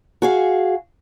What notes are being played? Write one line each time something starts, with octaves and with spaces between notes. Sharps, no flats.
F#4 G#4 F5